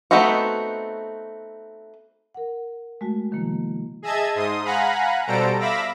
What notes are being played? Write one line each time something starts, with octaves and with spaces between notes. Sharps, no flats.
A3 B3 C4 D#4 F#4
A#4 F#5
G#3 A3 F#4
C3 D#3 F3 A3 A#3 E4
G#4 D#5 E5 A5 G#6
G#2 C6 D#6
F5 F#5 G#5 A#5 B5 F#6
B2 G3 A4 C5 A#5 D7
E5 F5 B5 D6 E6 A#6